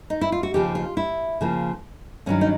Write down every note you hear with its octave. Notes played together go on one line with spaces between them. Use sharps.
D#4
E4
F4
F#4
D#2 C#3 F3 G4
F4
E4
C#3 F3 A#3
G2 D#3 F#3 C#4
D#4